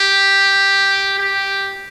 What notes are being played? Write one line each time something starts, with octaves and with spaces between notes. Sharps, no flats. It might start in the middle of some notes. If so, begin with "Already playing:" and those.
Already playing: G4
G4